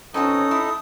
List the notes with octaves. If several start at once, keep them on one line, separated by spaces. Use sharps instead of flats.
B2 C4 C#4 D#4 F4 A4 D#6
E4